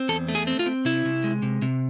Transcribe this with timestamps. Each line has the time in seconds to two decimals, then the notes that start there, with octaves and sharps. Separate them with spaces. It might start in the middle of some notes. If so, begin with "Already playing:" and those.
Already playing: C4
0.09 E2 A4
0.28 A3
0.35 G#4
0.47 C4
0.59 F4
0.66 C4
0.85 C3 E4
1.05 C3
1.24 G#3
1.42 C3
1.62 C3